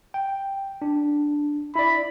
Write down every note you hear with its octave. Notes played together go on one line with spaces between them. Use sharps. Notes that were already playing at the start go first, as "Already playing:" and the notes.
G5
D4
E4 D5 B5